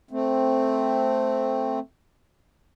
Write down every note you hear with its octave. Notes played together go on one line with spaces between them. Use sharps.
A3 C4